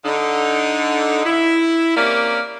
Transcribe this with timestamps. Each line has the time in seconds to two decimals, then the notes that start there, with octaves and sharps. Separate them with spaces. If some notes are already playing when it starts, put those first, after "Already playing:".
0.05 D3 D#4
1.26 E4
1.97 C3 A#3 C#4 A#4 D5 F5